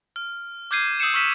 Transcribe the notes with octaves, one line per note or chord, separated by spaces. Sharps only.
F6
D6 F6 G6 G#6 C7 D#7
D#6 E6 G6 C7 C#7 E7
C#6 E6 F6 B6 D#7 E7